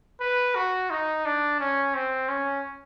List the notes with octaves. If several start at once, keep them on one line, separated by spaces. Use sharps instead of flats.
B4
F#4
D#4
D4
C#4
C4
C#4